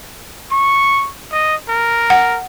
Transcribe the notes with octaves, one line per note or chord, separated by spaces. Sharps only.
C#6
D#5
A#4
F#5